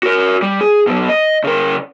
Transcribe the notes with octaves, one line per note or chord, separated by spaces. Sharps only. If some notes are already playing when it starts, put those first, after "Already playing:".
F#4 A#4
G3
G#4
B2 F#3
D#5
C#3 A#4